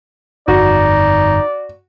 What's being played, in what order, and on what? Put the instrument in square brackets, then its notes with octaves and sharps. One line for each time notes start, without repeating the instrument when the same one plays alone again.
[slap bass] G1 F2 [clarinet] D#4 [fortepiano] F#4 [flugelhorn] D5